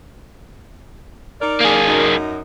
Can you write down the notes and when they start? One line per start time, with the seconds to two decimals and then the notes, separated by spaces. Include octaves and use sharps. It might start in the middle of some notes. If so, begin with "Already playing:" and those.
1.41 D#4 A#4 D5
1.61 A#3 G#4
1.86 F#2 D#4